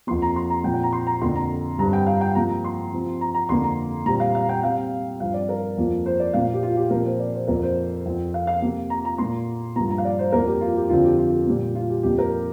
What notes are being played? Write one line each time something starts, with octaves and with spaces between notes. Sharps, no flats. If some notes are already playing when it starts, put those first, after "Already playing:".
F2 F3 A#3 C6
A#5
C6
A#5
A#2 F3 C4 G5
G5
A#5
C6
A#5
F2 D3 A#3 C6
A#5
G2 G3 C4 A#5
G5
F5
G5
C3 F3 A#3 A#5
A#5
C6
C3 F3 C4
A#5
A#5
F2 D3 A#3 C6
A#5
A#2 G3 C4 A#5
F5
F5
G5
C3 G3 C4 F5
G2 F3 C4 F5
D5
A#4
F2 F3 A#3
C5
D5
A#2 A#3 F5
G4
F4
G4
A#2 F3 C4 A#4
C5
D5
C5
F2 F3 A#3 A#4
C5
F2 F3 C4
F5
F5
C3 A#3
A#5
A#5
A#2 A#3 C6
G2 F3 A#3 A#5
A#5
F5
D5
C5
F2 F3 A#3 A#4
G4
F4
G4
F2 D3 F3 C4 F4
G4
F4
G4
A#2 G3 A#3
F4
G4
F2 F3 A#3 G4
A#4